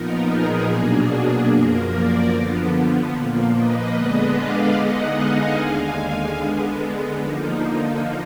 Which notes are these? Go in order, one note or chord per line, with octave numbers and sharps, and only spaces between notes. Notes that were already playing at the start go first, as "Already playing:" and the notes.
Already playing: A#2 F3 B3 D#4 A#4
G#4
B2 F#3 A#3 D4
F#2 F3 A#3 A#4
A#4 D5
D3 F3 B3
A#2 F3 A#3
B4 D#5
D3 G#3 B3 D4 B4 D#5
D5 F5
D3 G#3 B3 D#4 D#5 F#5
F5 G#5
D#2 D3 G#3
D3 G#3 B3
D3 F3 A#3 D#4